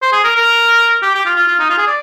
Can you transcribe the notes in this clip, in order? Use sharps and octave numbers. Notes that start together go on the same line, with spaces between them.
C5
G#4
A#4
A#4
G4
G4
F4
F4
F4
D#4
F4
G#4
D5